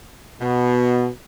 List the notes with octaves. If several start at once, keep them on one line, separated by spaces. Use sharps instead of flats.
B2